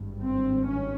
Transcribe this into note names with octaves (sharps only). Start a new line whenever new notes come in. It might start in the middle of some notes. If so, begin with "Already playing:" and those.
Already playing: G#1 G2
C4
C#4